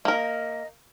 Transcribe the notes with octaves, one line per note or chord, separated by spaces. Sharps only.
A#3 A#4 D#5